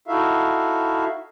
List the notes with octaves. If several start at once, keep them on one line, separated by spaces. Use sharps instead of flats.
D#4 E4 F#4 A4 E5 F5